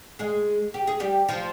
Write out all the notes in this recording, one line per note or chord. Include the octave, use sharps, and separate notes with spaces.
G#3 G#4
G4
G#4
G3 G4
F3 F4